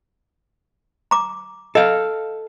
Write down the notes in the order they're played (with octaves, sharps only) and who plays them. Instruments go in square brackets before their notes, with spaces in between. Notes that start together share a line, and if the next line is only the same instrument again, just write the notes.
[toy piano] A#5 D6
[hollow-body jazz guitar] A4 F5 [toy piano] D#5